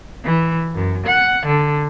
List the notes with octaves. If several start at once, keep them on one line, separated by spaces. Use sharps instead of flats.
E3
F#2
F#5
D3